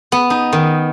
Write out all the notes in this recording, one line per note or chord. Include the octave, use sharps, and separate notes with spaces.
B3
D#4
D#3